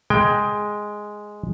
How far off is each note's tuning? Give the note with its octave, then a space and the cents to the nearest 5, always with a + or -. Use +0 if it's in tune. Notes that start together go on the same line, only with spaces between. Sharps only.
G#3 +0 G5 +15